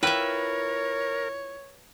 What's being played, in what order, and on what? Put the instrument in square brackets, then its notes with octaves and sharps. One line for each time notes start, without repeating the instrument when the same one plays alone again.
[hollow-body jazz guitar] E4 F4 G5 [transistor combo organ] A#4 [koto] B4 E5 [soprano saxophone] C#5